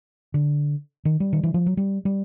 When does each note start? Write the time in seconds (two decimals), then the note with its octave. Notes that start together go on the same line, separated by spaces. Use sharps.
0.34 D3
1.05 D#3
1.20 G3
1.33 D#3
1.43 E3
1.54 F3
1.66 F#3
1.77 G3
2.05 G3